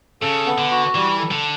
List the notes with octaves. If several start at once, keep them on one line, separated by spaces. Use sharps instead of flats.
C#3 A4
B3
D3
F#4
E3 G3
A4
D3